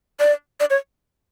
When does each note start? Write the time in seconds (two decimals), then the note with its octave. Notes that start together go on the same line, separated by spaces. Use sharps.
0.20 D5
0.60 D5
0.70 C#5